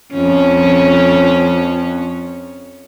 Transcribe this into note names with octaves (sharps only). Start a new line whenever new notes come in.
F2 C#4